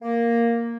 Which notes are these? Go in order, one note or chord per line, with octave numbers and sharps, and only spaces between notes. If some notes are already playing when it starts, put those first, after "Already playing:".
A#3